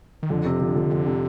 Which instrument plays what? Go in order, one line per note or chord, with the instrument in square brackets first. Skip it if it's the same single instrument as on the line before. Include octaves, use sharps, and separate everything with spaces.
[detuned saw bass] D#3
[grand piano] F2 [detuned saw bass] D3
[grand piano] C3
F3
F2
F2
C3